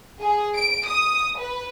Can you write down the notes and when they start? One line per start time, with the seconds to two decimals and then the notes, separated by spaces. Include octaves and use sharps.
0.20 G#4
0.56 D7
0.86 D#6
1.38 B4